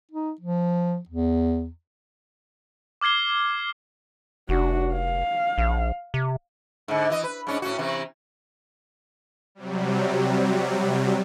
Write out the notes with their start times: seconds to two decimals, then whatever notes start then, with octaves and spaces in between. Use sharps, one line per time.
0.12 D#4
0.41 F3
1.09 E2
3.01 D6 F6 G#6 C7 G7
4.49 F1 D4 F#4
4.93 F5
5.58 A#1
6.14 C3
6.88 G#2 D3
7.10 E3 D#5
7.23 B4
7.47 G#2 C#4 D4
7.62 A2 C#4 F#4
7.78 C3 E3
9.55 C3 F#3 G3